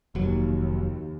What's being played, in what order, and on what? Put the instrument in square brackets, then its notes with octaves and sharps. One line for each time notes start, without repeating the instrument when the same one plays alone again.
[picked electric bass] F1 F#3 [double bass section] D#2